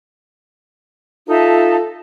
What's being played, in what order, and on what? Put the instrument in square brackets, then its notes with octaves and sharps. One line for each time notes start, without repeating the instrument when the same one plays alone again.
[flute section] D#4 E5 A5 [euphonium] F4 [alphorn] A4